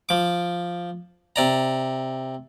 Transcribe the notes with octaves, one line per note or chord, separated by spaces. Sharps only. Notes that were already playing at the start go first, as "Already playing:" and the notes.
F3 D6
C3 D5 A#5